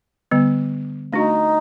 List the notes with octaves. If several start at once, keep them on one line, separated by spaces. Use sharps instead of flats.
D3 G3 B3
A3 D4 D#4 F#4